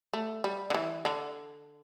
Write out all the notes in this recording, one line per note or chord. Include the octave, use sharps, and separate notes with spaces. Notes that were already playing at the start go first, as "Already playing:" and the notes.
A3
G3
D3
E3
D3